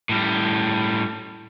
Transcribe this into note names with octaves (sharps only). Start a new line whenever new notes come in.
A2 G3